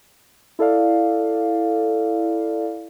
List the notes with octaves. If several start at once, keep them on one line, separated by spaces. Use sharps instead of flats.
E4 A4 D5 F5